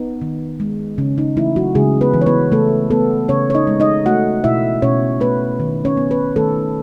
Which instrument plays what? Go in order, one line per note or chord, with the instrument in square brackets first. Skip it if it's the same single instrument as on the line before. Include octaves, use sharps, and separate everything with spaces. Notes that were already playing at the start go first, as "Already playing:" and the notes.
Already playing: [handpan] B3 D#4
D#3
G#3
C#3 C#4
D#4
E3 A3 E4
F#3 F#4
C#3 G#3 G#4
B3 B4
E3
C#5
B3 B4
C#3 A3 A4
A3 B3 A4
C#3 C#4 C#5
C#5
D#4 D#5
G#3
D#4 D#5
A3 F#4 F#5
B2 E4 E5
B2 C#4 C#5
A3 B3 B4
D#3
C#4 C#5
B3
B3 B4
D#3 A3 A4